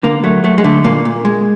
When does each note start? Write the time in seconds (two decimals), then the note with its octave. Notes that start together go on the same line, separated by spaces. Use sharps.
0.03 D3 A#3
0.23 F#3 A3
0.44 F#3 A3
0.58 G#3
0.64 D3 A3
0.84 A#2 A#3
1.05 A#2
1.25 G#3